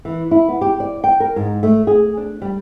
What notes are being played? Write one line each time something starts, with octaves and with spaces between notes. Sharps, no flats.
E3
E4
B3
G4
D5
G5
A#4
G#2
A3
G#4
D4
G3